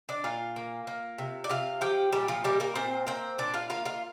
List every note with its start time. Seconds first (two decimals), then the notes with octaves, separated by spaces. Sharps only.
0.09 D4 D5
0.24 A#2 F4 F5
0.56 A#3
0.87 A#3
1.18 C3
1.44 D5
1.49 C3 F4 F5
1.81 F3 G4 G5
2.12 A#2 G3 G4
2.28 F3 F4
2.44 G3 A#3 G4
2.60 A#3 A#4
2.75 A#2 C4 C5
3.07 A#3 C4 C5
3.38 A#2 D4 D5
3.54 F4 F5
3.70 A#3 F4 F5
3.85 F4 F5